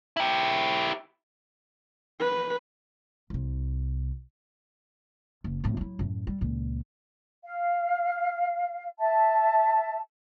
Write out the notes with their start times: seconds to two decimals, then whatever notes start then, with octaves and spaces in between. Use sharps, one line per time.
0.17 E4 G4
2.20 B4
3.30 C2 C3
5.44 F#1
5.64 F2 A2
5.77 F#3 E4
5.99 F#2 A2
6.27 G3
6.41 C#2 A#2
7.44 F5
8.99 E5 A5